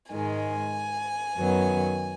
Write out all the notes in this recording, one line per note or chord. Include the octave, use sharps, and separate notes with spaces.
G#2 D#3 G#3 G#5
F#2 D#3 F#3 B3